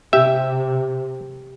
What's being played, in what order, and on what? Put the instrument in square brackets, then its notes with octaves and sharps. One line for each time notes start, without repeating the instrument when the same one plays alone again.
[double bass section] C3 [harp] G4 [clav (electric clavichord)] E5